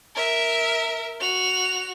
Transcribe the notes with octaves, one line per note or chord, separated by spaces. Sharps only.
A#4 E5
F#4 F7